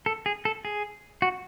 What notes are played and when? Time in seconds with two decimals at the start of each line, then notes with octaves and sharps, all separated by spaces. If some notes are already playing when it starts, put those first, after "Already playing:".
0.06 A4
0.26 G#4
0.45 A4
0.65 G#4
1.22 F#4